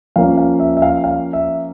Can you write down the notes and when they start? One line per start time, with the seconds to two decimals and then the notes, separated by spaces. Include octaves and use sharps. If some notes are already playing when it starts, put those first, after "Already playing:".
0.16 F3 A#3 C#4 F5
0.37 F5
0.60 E5
0.77 E5
0.82 F5
1.04 F5
1.33 E5